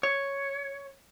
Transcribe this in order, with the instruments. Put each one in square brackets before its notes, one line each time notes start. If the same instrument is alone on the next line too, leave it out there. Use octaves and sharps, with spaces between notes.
[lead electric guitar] C#5